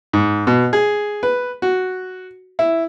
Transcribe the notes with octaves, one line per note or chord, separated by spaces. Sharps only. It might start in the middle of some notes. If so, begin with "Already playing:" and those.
G#2
B2
G#4
B4
F#4
E4